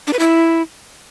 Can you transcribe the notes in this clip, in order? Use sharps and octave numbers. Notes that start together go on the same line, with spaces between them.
D4
B4
E4